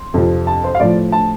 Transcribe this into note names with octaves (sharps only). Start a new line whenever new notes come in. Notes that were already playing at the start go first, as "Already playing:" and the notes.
Already playing: C6
F2 C3 F3
A5
C5
F5
A2 F3 D5
A5